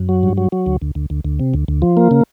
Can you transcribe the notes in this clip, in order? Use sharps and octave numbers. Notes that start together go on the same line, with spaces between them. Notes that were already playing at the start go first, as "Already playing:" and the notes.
Already playing: F#2
F#3
G2
F#3
F#3
D2
D2
D2
D2
D2
C3
D2
D2
F3
A#3
C#3